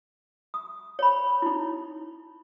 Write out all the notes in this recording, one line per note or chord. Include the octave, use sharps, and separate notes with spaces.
D#6
C#5 B5
D#4 E4